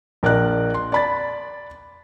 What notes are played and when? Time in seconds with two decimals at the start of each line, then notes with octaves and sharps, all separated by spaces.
0.23 A#1 A#4 D5 D#5 F#6
0.74 C6
0.92 D5 B5 A6